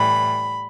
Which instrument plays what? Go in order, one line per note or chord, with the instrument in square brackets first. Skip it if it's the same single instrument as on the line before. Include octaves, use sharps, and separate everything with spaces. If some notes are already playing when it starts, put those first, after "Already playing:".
Already playing: [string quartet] A2 E3 G3 B5